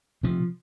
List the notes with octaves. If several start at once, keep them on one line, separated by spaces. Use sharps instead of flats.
C3 F3